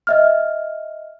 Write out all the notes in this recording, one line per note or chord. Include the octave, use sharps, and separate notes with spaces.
D#5 E5 F6